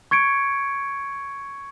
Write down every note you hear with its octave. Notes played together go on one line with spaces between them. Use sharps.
C#6 G#6 C#7 D7